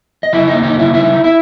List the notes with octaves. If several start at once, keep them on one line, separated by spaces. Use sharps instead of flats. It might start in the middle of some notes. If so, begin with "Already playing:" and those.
D#5
C#3 E4 E5
A#3 D#4 D#5
D#4 D#5
C#3
E4 E5
D#4 E4 E5
D#4
E4 E5